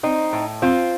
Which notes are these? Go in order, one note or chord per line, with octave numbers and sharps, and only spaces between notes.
C4 D#4
A2
C4 F4